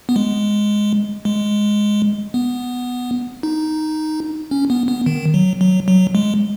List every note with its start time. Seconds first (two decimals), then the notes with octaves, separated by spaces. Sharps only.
0.09 B3
0.16 G#3
1.25 G#3
2.34 B3
3.43 D#4
4.51 C#4
4.70 B3
4.88 B3
5.06 D#3
5.34 F#3
5.61 F#3
5.88 F#3
6.15 G#3